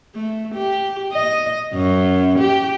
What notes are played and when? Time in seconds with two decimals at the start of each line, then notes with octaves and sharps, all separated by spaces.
0.15 A3
0.55 G4
1.13 D#5
1.75 F#2
2.39 G4